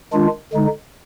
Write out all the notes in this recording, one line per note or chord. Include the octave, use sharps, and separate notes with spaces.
D#3 G#3 D4 F4
D3 G#3 D#4